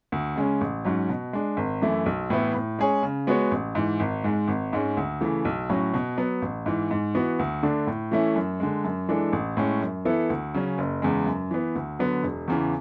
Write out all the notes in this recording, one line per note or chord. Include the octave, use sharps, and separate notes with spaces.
D2
C#3 G#3 C#4
A1
G#2 F#3 C#4
B2
G#3 D4
G#1
F#2 E3 A3 E4
B1
A2 E3 B3 E4
A2
G#3 C#4 G#4 C#5
C#3
G#3 B3 F#4 C#5
A1
G#2 E3
G#1
G#2 G#3
G#1
G#2 G#3 C#4
D2
C#3 E3 A3
B1
A2 F#3 C#4 F#4
B2
F#3 B3
A1
G#2 E3
G#2
E3 B3 F#4
D2
D3 A3 D4
A2
E3 A3 C#4 E4
F#2
D3 G#3
F#2
E3 G#3 D4 A4
A1
A2 G#3 C#4
F#2
E3 B3 E4 A4
D2
C#3 F#3 C#4
F#1
E2 C#3 G#3
F#2
E3 B3
D2
D3 F#3 B3
E1
E2 C#3 E3